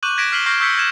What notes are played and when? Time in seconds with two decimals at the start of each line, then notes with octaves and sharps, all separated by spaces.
0.03 C#6 D6 F#6 G6 D#7 F#7
0.18 G#6 A#6 B6 D7 E7
0.32 F6 B6 C7 D#7 F#7 G7
0.46 C#6 F6 G6 A#6 C7
0.60 C#6 E6 G6 G#6 B6 C#7
0.76 F6 G#6 E7